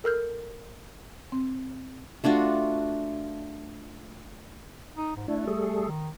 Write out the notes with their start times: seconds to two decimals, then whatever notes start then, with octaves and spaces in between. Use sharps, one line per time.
0.04 A4 A#4 F6 G6
1.32 C4
2.24 A3 D4 F4 F#4
4.97 D#4
5.16 G#2
5.28 A3 D4 E4
5.47 G3 G#4 A4
5.87 D#3